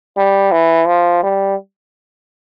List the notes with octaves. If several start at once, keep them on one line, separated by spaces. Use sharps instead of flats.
G3
E3
F3
G3